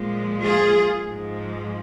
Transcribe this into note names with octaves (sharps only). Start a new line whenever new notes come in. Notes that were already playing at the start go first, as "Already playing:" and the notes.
Already playing: A#2 F3 G#3
F4 G#4
G#2 F3 G#3